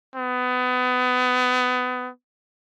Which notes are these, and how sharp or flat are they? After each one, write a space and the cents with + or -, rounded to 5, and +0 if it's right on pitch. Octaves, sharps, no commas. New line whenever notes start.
B3 +25